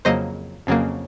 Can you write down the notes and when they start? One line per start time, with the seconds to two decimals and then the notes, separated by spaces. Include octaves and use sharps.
0.05 F2 C#3 F#3 A#3 C5 D#5
0.67 F2 C#3 F#3 A#3